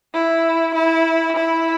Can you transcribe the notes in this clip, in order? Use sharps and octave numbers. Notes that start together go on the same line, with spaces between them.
E4
E4
E4